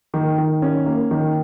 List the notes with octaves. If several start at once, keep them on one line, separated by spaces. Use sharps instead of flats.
D#3
D#3
C#4
A#3
D#3